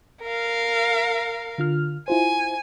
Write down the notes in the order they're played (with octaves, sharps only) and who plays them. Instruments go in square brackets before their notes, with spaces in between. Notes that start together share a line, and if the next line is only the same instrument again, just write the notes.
[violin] A#4 F5
[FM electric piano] D3 F4 F6
[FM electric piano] E4 F4 C5 [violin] G#5